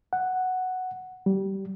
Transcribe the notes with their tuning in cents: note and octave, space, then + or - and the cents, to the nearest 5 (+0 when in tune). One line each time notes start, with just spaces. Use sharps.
F#5 +0
G3 -20